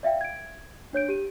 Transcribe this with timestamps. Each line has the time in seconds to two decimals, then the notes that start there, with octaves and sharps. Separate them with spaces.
0.03 D5 E5 F5 G5
0.21 G#6 D7
0.93 D4 C#5 G6 D7
1.09 G4 D#7